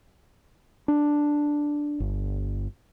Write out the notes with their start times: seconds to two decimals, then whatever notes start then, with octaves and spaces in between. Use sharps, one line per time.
0.88 D4
2.00 G1